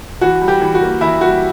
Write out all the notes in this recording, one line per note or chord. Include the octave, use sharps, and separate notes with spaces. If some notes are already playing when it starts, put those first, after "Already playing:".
E3 F#4
G3
G4
E3
F#4
A#3
E3 E4
G3 F#4